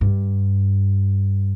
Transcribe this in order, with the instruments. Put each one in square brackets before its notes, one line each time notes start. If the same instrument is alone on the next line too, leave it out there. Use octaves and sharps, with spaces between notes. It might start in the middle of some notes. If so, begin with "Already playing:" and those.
[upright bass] G2